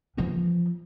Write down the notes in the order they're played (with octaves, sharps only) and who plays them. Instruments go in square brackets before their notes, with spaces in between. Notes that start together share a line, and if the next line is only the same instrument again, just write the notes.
[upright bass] E3 F3